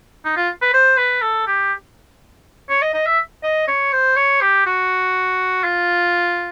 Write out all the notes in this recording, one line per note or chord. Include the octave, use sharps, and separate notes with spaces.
D#4
F4
B4
C5
B4
A4
G4
C#5
D#5
D#5
E5
D#5
C#5
C5
C#5
G4
F#4
F4